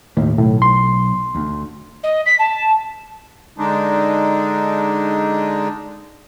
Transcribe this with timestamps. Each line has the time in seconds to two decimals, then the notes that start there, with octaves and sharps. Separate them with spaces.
0.17 D#2 A2 A#3
0.38 B1 A2
0.62 C6
1.35 D2
2.03 D#5
2.26 B6
2.39 A5
3.58 D3 G#3 D4 D#4